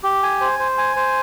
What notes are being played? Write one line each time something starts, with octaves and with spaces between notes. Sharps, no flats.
G4
G#5
C5
C5
G#5
C5